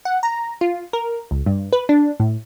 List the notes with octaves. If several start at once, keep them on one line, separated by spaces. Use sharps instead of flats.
F#5
A#5
F4
A#4
C#2
G2
B4
D4
A2